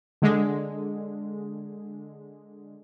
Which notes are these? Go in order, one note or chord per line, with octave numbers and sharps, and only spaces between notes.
D3 G#3